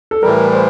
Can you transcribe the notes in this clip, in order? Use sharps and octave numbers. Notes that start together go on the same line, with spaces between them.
A4
A2 E3 G3 A#4
C5